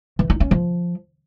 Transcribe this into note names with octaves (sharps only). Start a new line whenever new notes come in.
E3
D#4
C#4
F3